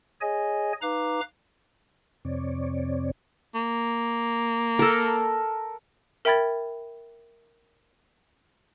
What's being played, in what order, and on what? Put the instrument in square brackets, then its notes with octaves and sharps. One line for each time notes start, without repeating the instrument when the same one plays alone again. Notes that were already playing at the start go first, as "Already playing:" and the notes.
[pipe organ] G#4 C#5 D#5 G#5
D#4 B4 F5 A#5 D6
[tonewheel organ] F2 C3 C4 C#5 D5
[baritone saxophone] A#3
[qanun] A4 A#4
[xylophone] A#4 E5 G5 B5 G#6 A6